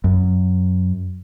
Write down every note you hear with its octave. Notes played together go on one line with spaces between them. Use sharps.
F#2